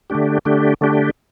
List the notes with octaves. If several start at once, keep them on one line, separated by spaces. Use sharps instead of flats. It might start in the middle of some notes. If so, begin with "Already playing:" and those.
D3 A3 D4 G4
D3 A3 D4 G4
D3 A3 D4 G4